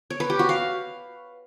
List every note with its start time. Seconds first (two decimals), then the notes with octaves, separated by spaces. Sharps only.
0.10 C#5
0.20 B4
0.30 G4
0.39 F#4
0.49 F5